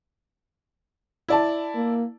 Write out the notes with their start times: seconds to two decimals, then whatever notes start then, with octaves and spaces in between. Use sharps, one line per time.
1.28 E4 D5 A5
1.75 A#3